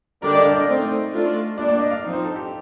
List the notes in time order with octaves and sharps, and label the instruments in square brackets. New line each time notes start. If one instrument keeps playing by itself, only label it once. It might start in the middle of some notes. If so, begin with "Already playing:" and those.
[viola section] D3 G3 D4 G4 D5 [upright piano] A#4
[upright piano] D#5
F5
D5
D#5
[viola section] A3 C4 D#4
A3 D4 F4 A4
[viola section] G3 A#3 D4 [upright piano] D5
[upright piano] D5
D#5
F5
[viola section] F3 C4 D#4
[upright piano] C5
A4
G4